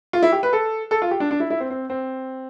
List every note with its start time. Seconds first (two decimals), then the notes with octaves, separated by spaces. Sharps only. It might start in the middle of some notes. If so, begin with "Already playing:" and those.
0.13 F4
0.23 E4
0.32 G4
0.43 B4
0.53 A4
0.91 A4
1.02 F4
1.11 G4
1.20 D4
1.31 D4
1.40 E4
1.50 E4
1.60 C4
1.70 C4
1.90 C4